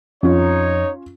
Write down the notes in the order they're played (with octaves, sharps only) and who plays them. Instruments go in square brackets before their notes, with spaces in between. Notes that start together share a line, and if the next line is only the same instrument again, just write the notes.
[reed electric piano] F2 [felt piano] C#4 F4 [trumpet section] D#4 C#5